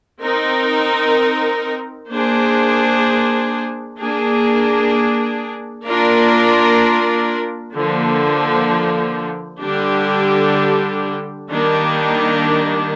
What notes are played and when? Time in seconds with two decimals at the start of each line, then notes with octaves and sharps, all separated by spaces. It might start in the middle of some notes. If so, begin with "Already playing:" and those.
0.21 C4 D#4 A#4
2.09 A#3 D4 G#4 C5
3.98 A#3 D4 G#4
5.85 A#3 D4 F4 A#4 D5
7.75 D3 F3 A#3
9.63 D3 G3 D4 G4
11.50 D#3 G3 A#3 D4